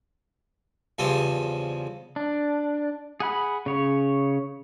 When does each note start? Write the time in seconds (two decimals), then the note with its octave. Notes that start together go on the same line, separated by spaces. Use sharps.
0.98 E2 C#3 F3 G3 C4
2.16 D4
3.20 G#4 F#5 B5
3.66 C#3 C#5